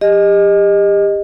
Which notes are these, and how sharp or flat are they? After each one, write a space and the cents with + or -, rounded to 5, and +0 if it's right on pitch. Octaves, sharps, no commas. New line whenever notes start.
G4 +30 D#5 -10